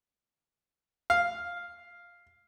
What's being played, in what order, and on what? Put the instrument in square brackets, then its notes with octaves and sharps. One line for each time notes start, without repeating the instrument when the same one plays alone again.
[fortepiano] F5